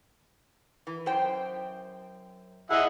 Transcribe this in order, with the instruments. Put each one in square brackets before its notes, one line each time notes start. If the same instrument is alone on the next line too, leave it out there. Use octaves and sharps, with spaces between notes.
[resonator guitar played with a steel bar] E3
F#2 C5 G5
[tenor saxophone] E4 [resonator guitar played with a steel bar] G#4 [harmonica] D#5 E5 F#5